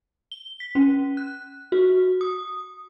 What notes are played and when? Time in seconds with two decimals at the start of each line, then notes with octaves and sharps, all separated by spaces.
0.32 G7
0.60 B6
0.75 C#4
1.17 F#6
1.72 F#4
2.21 D#6